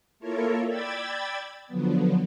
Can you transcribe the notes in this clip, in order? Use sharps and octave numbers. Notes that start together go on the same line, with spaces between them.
A#3 E4 F4 A4 A#4 C#5
D5 G5 B5 E6 G#6 A6
D3 F3 F#3 B3